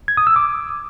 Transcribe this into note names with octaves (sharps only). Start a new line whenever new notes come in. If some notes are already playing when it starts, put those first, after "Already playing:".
G#6
D#6
E6
D6